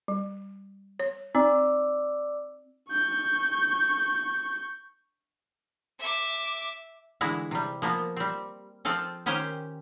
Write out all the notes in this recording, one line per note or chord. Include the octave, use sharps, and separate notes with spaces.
G3
C#5
C4 D#4 D5 D6 E6
C#6 G6
E5 D6
D3 E3 G#3 E4 F#4
C3 G3
F3 A#3 B3
G3 C4
F3 C4 F4 A4 C5
D#3 C#4 G4 C5 G5 G#5